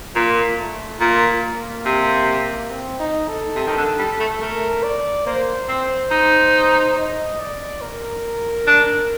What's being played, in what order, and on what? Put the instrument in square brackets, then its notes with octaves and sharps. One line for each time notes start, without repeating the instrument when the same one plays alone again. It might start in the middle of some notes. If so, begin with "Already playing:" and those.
[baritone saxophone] A#2 [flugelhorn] A#3
[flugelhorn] A3
[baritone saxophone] A#2 [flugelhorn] A#3
[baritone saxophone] C3
[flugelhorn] C4
D#4
A4
[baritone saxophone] C3
D#3
D3
G3
A3
[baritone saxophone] A3 [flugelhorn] A#4
[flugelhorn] D5
[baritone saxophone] A#3 [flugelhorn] C5
[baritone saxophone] C4
D#4
[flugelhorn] D#5
D5
A#4
[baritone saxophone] D4